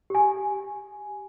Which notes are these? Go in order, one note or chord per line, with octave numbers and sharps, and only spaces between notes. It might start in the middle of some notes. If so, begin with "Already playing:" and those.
G4 G#5